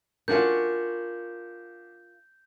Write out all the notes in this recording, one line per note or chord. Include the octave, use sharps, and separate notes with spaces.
C#4 D4 F4 F#4 A#4 G6